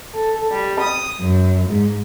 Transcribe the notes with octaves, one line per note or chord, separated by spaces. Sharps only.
A4
G3
D#6
F#2
G#2